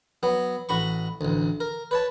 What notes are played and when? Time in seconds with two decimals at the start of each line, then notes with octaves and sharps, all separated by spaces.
0.23 F#3 B3
0.69 A1 F#4 B5 C#6
1.21 A1 D2
1.60 A#4
1.91 B4 C#5 A5